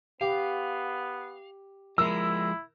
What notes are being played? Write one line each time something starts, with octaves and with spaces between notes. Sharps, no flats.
B3 G4 F5
F3 G#3 E4 A#4 E6